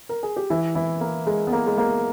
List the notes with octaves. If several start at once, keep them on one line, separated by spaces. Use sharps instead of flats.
A#4
G#4
G4
E3 E4
E3 E4
A#3
G#3
B3
A#3
G#3
A#3